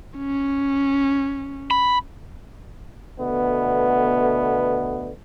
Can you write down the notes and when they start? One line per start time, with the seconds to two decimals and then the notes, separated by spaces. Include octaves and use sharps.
0.19 C#4
1.71 B5
3.20 B2 D3 A3 B3